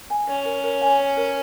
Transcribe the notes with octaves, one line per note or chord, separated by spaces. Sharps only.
G#5
C#4 C#5
A#4
A#4
G#5
C#5
A#4